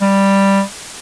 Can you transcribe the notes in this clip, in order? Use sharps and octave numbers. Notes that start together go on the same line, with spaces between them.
G3